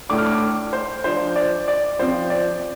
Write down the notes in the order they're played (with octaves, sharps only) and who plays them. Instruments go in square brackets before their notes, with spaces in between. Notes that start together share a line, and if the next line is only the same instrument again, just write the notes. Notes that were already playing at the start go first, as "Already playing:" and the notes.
[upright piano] A2 A3 D4 D6
F6
D6
C5
F3 D4 C5
D5
D5
F3 C4 C5
D5